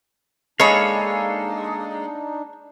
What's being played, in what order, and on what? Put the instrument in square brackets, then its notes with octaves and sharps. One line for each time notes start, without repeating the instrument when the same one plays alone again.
[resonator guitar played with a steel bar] G#3 [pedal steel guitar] A#3 A4 F5 [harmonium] D4 D#4 [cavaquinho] C#5 B5